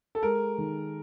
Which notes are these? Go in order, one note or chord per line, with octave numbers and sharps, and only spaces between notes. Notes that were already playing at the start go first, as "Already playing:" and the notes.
A4
G#3 A#4
D#3